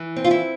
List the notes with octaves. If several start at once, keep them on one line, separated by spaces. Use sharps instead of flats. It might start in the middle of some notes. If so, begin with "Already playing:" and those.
Already playing: E3
C4
F4
E4